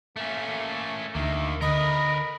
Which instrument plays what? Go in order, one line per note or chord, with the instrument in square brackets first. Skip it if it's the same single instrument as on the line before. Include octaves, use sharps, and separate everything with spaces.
[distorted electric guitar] A3 C#4 [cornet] A#3
[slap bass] D2 [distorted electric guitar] D#3 A#3 [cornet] E5
[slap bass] D3 [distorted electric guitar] A#4 B4 [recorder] D#5 [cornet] B5